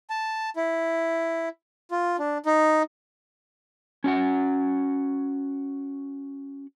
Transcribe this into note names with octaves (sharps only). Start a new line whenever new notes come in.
A5
E4
F4
D4
D#4
C#4 F#4 F#5